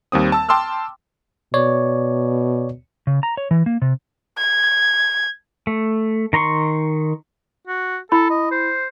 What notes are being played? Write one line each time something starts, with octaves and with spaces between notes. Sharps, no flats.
D#2 G3 C4 D#6
A5 E6
G5 A5 C6 D6 E6 F6
B2 C#5 D5
C#3
A#5
C#5
E3
A#3
C3
G#6
A3
D#3 A#5 C6 C#6
F#4
E4 A4 B5
D#5
C5